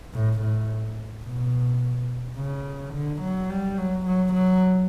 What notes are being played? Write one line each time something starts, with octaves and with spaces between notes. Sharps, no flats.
A2
A2
B2
C#3
D3
F#3
G3
F#3
F#3
F#3